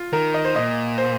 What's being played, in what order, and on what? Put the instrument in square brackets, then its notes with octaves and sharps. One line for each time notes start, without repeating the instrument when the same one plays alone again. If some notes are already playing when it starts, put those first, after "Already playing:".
Already playing: [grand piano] F4
[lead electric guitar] D#3 [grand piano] A#4
[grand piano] D#5
C5
[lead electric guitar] A#2 [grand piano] D#5
[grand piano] C5